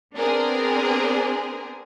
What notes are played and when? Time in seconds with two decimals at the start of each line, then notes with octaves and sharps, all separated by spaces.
0.16 B3 C4 D4 G#4 A#4 C5